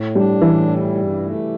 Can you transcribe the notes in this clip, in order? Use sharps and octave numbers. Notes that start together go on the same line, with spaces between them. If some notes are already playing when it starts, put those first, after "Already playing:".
Already playing: A2
G3 D4
A2 E3
G3
G2
A3